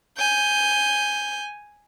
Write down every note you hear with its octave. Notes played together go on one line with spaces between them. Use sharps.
G#5 G6